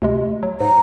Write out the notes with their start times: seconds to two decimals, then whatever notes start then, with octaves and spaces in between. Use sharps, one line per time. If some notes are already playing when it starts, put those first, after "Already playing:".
0.02 D2 C3 G#3
0.43 F#3
0.60 G#2 A#5